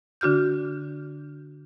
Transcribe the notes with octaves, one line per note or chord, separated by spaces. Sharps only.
D3 D4 F#4 F6 G6